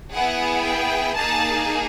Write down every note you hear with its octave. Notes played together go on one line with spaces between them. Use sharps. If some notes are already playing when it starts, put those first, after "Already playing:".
B3 E4 G#4 F#5
G5
A#3 D#4 G#4 A5